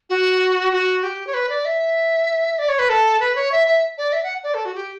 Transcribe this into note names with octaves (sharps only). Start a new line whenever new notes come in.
F#4
F#4
G4
C#5
B4
D5
E5
D5
C#5
B4
A4
B4
C#5
E5
E5
D5
E5
F#5
D5
A4
F#4
G4